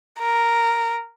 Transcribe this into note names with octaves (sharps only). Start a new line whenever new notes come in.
A#4